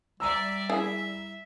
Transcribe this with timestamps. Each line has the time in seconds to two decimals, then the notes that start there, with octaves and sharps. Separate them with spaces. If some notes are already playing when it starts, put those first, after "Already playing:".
0.20 G3 D5 E5 A#5 E6
0.70 E4 G#4 E5